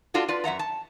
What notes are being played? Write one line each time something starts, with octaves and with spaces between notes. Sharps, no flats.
D4 F4 F#4 A4
F4 B4 D5
F#2 E5 F#5 A#5
A5